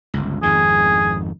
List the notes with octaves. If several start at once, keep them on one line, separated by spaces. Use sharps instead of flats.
G1 C#2
G#1 F2 D#3 G#4